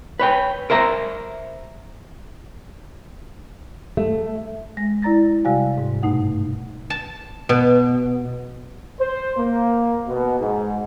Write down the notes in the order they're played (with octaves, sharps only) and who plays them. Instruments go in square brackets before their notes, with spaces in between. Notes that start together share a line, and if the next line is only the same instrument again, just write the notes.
[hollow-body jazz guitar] B4 C#5 G5
A#4 C5 E5 A#5
[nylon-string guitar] A3
[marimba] G#3 A#6
E4 D5 A#5 A6 A#6
C3 G3 F#4 D5 F5 G#5
G#2
G2 B2 A3 D#4 F#5
[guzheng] A5
B2
[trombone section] C5
A#3
B2
G#2